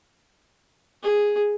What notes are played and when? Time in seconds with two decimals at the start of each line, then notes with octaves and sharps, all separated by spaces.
1.03 G#4